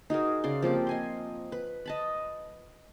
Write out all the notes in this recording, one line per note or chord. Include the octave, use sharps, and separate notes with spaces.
D#4 F#4 G#4 A#4
C#3 D5 C6
F3 A#3 C4 G4
D#5 G#5 C6
B4
D#5 A5 B5